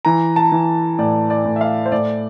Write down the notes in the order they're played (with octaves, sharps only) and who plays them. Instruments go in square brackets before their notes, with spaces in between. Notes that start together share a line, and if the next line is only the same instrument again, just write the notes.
[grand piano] E3 A#5
A5
E3
A2 D5
D5
A2
E5
F5
C5
A2 D5